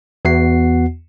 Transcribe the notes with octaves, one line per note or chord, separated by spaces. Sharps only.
E2 B3 F#4 F#5 C7